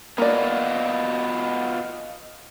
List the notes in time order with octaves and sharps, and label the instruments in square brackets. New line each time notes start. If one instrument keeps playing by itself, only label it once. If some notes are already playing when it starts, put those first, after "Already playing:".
[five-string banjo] A#3 D5 [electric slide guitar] B3 F4 F#4 [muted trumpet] D#5